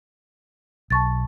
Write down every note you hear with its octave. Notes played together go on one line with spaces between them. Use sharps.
B1 A5 C#6 A6